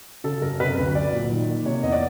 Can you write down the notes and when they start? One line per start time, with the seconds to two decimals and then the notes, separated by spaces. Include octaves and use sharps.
0.24 C#3 A4
0.42 F#2 A#4
0.59 C3 B4
0.77 D2
0.95 F#3 D5
1.13 A#2
1.31 D#3
1.48 A#3
1.66 C3 C#5
1.83 E2 D#5
1.92 D5